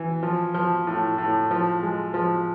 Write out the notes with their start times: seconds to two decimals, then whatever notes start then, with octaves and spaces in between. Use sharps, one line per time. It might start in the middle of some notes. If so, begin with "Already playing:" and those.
Already playing: E3
0.23 F3
0.54 F3
0.87 A2
1.18 A2
1.51 F3
1.83 G#3
2.14 F3